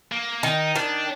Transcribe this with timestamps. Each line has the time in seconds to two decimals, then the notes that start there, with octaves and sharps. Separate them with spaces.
0.12 A#3
0.43 D#3 D#4
0.76 D#3 D4